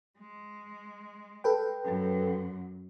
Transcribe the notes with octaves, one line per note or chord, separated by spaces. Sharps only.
G#3
A4 B4 G5
F#2